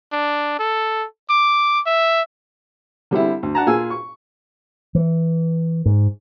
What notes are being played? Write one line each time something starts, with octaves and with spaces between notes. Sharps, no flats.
D4
A4
D6
E5
D3 G3 C4 E4
D2
D4 F#5 A5 A#5
A#2 F4 G#4 G#5 E6
C#6
E3
G#2